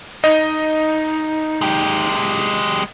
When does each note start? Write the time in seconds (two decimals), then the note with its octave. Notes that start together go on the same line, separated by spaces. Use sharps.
0.24 D#4 D#5
1.61 G#3 G4